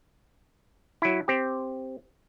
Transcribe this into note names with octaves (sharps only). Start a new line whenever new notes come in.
F#3 E4
C4 G4